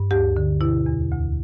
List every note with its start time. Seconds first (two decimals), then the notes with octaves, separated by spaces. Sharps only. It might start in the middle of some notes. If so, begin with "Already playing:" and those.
Already playing: G2
0.11 D2 G4
0.37 D3
0.61 B2 E4
0.86 E2
1.12 D2